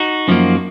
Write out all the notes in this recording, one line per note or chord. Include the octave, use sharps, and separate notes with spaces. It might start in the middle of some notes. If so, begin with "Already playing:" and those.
Already playing: D#4 F#4
F#2 F3 A#3